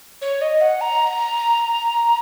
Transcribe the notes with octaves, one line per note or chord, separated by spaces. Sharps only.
C#5
D#5
F#5
A#5